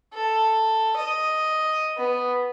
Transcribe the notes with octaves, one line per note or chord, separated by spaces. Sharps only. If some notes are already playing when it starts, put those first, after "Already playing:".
A4
D#5
B3